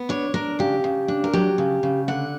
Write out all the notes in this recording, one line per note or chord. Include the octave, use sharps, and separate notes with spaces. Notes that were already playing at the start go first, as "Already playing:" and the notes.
Already playing: B3
D4 C#5
D4 A#4
C#3 G4
C#3
D4
A#4
F#3 G4
C#3
C#3
D3 F#5